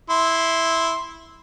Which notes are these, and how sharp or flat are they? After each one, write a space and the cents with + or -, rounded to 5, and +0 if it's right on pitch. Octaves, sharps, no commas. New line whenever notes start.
E4 -5 C6 +0